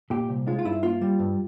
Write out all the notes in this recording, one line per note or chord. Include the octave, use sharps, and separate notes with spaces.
A#2 G4
C2
G#3 F4
F4
G2 E4
A#3 F4
G3
G2